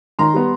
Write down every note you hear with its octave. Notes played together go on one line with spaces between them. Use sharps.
D#3 A#5 C6
G3 B3